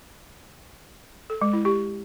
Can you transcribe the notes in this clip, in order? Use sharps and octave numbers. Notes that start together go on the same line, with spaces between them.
A4
G#3
E4
G4